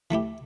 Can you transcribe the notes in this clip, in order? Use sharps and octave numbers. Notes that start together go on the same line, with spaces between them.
E3 A3 E4 G4